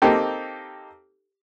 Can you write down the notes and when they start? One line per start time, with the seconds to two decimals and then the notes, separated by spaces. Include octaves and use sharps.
0.02 A#3 C4 D#4 G4 A4